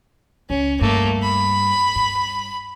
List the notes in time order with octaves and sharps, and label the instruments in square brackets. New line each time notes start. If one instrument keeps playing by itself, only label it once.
[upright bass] C#2 [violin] C#4
[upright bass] G2 [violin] A3 A#3
[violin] B5
[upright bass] G2